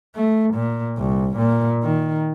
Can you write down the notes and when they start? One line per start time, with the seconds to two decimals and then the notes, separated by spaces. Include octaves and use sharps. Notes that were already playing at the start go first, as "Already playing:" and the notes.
0.16 A3
0.54 A#2
0.97 C2
1.37 A#2
1.83 D#3